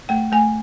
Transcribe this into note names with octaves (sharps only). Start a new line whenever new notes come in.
A3 G5
A3 G#5